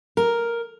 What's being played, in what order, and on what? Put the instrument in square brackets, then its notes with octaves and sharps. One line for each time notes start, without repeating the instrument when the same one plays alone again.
[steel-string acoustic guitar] A#4